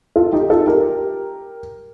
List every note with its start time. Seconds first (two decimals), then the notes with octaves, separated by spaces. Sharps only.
0.16 F4 A4
0.33 D#4 G4
0.50 F4 A4
0.67 G4 A#4